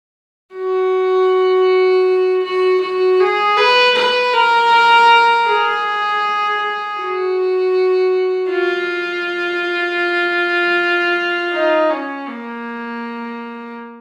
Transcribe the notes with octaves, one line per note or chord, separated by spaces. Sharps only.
F#4
F#4
F#4
G#4
B4
B4
A#4
G#4
F#4
F4
D#4
C#4
A#3